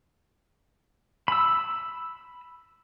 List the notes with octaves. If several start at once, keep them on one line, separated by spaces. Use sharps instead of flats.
B5 E6